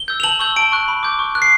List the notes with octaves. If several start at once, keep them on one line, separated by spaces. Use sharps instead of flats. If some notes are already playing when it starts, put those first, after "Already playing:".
Already playing: G7
E6 G6
F7
A5 F#7
C#6 E6 G6 G7
A5 D7
C#6 F#6
B5
D6 G6
C#6
F#6
C7